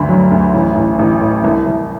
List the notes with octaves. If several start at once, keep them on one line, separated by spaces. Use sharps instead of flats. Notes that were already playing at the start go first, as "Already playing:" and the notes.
Already playing: D2 G2 D3 B5
F#3
D2
A1
A1
A1
A2
C2
C2